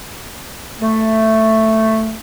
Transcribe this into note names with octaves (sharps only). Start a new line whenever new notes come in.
A3